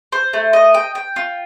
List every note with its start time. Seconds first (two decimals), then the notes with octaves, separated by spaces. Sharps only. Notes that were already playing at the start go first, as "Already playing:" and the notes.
0.12 C5
0.33 A3
0.53 D#5
0.74 G5
0.95 G5
1.16 F4